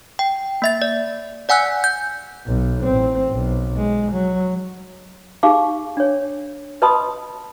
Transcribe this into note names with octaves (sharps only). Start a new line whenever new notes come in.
G5
A#3 E5 A6
D5
D5 F#5 G#5 E6 F#6
G6
B1
A1 C4
B1
G#3
F#3
D#4 G4 G#4 F5 C#6 D6
D4 C#5
B4 D#5 A5 B5 C6 D#6